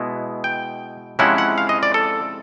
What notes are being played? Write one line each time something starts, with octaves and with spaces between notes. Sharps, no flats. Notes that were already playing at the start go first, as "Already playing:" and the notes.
Already playing: B2 G#3 B3 E4
G5
C3 F3 G#3 C#4 E4 F#5
F#5
F5
D#5
D5
A4